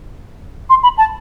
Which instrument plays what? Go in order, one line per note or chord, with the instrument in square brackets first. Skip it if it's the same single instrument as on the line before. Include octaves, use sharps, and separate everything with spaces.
[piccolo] C6
B5
A5